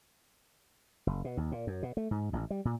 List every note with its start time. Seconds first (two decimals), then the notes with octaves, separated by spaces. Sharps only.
1.07 F#1
1.25 B2
1.37 D#2
1.52 A#2
1.67 F#2
1.83 B2
1.97 A3
2.11 G#2
2.33 A1
2.50 G3
2.65 A#2